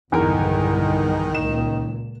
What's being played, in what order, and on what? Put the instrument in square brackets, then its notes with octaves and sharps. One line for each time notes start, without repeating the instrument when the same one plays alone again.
[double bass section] B1 G2 D3 [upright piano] E2 A#4 [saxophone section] D#3
[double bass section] C#2 A#2 [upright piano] E7